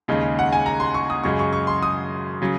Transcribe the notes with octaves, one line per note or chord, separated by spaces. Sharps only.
D#2 C#3 G#3 D#4
F#5
G#5
A#5
C6
C#6
D#6
F#2 C#3 G#3 C#6
C#6
C#6
C6
D#6
C#3 F#3